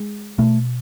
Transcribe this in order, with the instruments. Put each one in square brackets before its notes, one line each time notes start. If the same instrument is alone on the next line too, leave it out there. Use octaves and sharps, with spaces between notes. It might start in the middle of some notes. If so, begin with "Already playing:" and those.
Already playing: [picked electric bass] G#3
B2 A3